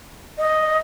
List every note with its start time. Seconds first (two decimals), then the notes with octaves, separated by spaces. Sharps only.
0.39 D#5